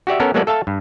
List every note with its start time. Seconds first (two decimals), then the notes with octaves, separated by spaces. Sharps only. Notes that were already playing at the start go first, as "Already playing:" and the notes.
0.07 F#4 G4 D5 E5
0.20 B3 C#4 A4 A#4
0.34 F#3 G#3 A#3 B3 A4 D5
0.47 A4 E5 F5 A5
0.67 G2